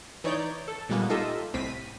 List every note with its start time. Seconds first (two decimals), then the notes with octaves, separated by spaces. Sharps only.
0.24 E3 D#4 C#5 D5 G6
0.68 A4
0.89 A#2 D3 G3 G#3 A#3 B3
1.10 D#4 F4 G4 A4 D#5 E5
1.54 C2 A2 C4 B6 D#7